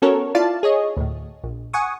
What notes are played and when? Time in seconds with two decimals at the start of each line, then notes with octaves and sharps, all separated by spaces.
0.02 B3 C#4 F#4 A4 A#4 C#5
0.35 E4 F4 D5 F5 A5
0.63 G#4 C#5 D#5
0.97 D2 A2
1.44 A#1
1.73 F#5 G#5 C#6 D#6